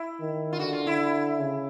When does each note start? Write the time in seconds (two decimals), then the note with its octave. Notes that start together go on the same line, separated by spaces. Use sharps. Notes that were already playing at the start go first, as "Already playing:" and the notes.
Already playing: E4
0.20 D#3
0.53 F4
0.59 D3 F#4
0.73 F4
0.87 E4
1.39 C#3